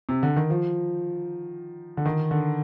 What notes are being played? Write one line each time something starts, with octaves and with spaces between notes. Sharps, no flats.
C3
D3
D#3
F3
D3
D#3
D3